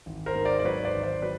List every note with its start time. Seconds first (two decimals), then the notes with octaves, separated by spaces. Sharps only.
0.06 G#1
0.26 A#4 C5
0.35 G#2
0.45 C5 D5
0.59 D5
0.65 F#3 B4 C#5
0.85 C5 D5
0.94 G#1
1.03 C5 D5
1.22 F#3 B4